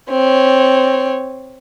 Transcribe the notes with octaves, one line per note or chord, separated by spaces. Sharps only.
C4 C#5